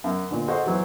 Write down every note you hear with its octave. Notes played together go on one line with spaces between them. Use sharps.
F#2
D2 A#2
F#4 G#4 A4 C5 D#5 F#5
E3 F#3 E4 C5